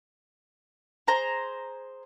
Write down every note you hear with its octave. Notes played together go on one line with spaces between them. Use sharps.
G#4 C5 A#5